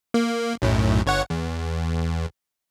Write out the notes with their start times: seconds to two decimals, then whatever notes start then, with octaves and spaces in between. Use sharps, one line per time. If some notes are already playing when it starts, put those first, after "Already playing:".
0.14 A#3
0.62 B1 F#2 A2
1.06 G1 C#5 F#5
1.30 E2